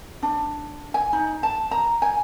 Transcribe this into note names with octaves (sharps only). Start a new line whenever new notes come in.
D4
G#5
D#4
A5
A#5
G#5